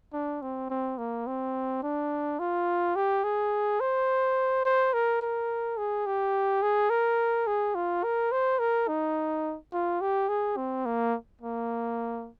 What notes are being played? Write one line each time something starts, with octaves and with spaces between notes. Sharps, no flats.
D4
C4
C4
A#3
C4
D4
F4
G4
G#4
C5
C5
A#4
A#4
G#4
G4
G#4
A#4
G#4
F4
A#4
C5
A#4
D#4
F4
G4
G#4
C4
A#3
A#3